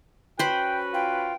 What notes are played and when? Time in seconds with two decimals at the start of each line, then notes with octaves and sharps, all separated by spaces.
0.39 C#4 F#4 B4 C5 G5 B5
0.94 F4 G5